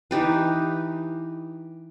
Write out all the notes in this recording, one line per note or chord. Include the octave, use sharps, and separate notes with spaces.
E3 D#4 G4 B4